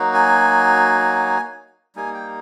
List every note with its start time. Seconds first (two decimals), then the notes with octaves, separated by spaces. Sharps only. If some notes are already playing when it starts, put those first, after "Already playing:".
Already playing: F#3 A#3 D#4 F#4
0.14 G#5
1.96 G3 A#3 D#4 G#5
2.14 G5